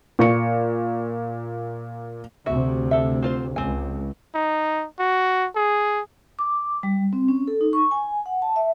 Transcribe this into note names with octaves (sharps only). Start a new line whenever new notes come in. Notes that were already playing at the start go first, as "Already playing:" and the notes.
A#2 C#6 C#7
D2 C3 F#4 E5
A4 E5
C4 F4 C5
C#2 C4 G#5
D#4
F#4
G#4
D6
G3
C4
C#4
A4
D#4
C#6
G#5
F#5
A5
E5